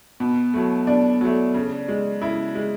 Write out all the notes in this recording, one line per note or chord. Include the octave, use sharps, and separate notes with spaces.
B2
F#3 A3
B2 D4
F#3 A3
C#3
G#3
C#3 E4
G#3